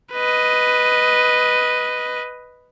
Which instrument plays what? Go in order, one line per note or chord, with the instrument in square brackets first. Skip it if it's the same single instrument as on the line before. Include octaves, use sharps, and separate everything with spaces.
[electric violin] B4 D#5